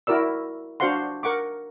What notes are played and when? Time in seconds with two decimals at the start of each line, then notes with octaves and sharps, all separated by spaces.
0.07 E4 F#4 A#4 D5 E6
0.80 D4 F#4 C5 F5 F#5 C6
1.23 A#4 F#5 C#6 D6